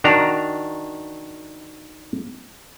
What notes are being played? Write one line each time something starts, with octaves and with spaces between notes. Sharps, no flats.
D#3 D4 F#4 A#5